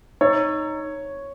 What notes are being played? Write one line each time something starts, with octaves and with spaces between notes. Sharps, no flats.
D#4 C#5